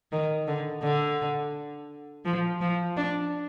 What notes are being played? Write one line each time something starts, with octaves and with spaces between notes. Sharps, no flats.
D#3
D3
D3
F3
F3
D4